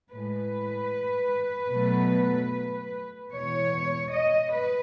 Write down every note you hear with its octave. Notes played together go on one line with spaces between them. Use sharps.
A2 G#3 B4
B2 F#3 A3
E2 B2 G#3 C#5
D#5
B4